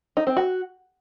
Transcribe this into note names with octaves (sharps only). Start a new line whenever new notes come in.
D#4
C4
F#4